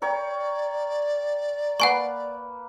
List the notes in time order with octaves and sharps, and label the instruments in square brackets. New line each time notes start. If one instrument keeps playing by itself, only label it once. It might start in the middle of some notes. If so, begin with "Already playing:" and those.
[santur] A#4 C#5 G5 [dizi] D5
[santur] A#3 B4 [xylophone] F#5 G#5 C#6